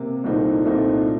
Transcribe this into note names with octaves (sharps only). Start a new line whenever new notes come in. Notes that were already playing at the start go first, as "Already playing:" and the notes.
Already playing: C3 A#3
C2 A#2 A3 C4 D#4
C2 A#2 A3 C4 D#4